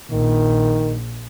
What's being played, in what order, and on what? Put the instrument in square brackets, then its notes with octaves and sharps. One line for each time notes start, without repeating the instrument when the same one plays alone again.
[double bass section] A#1 [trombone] D#3